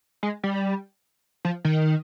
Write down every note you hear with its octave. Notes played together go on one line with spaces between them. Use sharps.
G#3
G3
F3
D#3